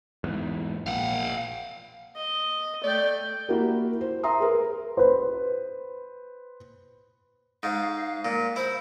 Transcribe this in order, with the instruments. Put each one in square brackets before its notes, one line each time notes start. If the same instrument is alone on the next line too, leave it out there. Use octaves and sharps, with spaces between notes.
[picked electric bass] E2 G#2
[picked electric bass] A#1 [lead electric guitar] F5 F#5
[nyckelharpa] D#5
[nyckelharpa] A3 G5 [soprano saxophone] D5
[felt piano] A#3 E4 F#4 G4 A#4
C5
E5 A#5 C6 D#6
G#4 A#4 B4
[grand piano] B4 C5
[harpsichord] G#2 [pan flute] F5
[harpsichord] A#2
[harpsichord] E4 [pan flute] C5